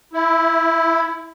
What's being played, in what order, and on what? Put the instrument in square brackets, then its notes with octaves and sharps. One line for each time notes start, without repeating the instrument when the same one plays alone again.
[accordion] E4